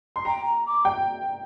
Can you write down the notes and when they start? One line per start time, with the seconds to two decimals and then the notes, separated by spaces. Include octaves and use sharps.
0.16 C6
0.25 G5 A#5
0.45 A#5
0.66 D6
0.85 G5